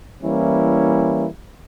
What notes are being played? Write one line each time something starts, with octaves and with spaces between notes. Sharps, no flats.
E3 G3 A#3 C#4 E4